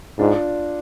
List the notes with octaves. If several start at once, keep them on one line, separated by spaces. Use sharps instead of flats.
G#2 D4 F4